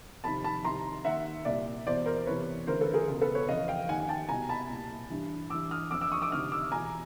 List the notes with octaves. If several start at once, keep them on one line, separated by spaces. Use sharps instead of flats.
F2 C3 D#3 A5 B5
A5 B5
C2 C3 D#3 A#5 C6
D#2 D#3 E5 F#5
C2 A#2 D5 E5
E2 B2 C5 D5
A#4 C5
E2 C3 E3 B4 C#5
D2 C#3 E3 A#4 C5
A4 B4
G#4 A#4
C#2 B2
A4 B4
B4 C#5
F2 C#3 E3 D#5 F5
F5 G5
D#2 D#3 F#5 G#5
G#5
G5 A5
C2 B2 G#5 A#5
A5 B5
C2 A#2
G2 E3
G2 E3 D6 E6
D#6 F6
F2 D3 D6 E6
D6 E6
C#6 D#6
D6 E6
D2 C3 D#3 D#6 F6
D6 E6
E2 B2 G#5 A#5